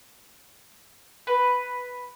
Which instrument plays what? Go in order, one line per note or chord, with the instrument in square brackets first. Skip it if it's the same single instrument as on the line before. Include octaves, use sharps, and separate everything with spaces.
[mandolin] B4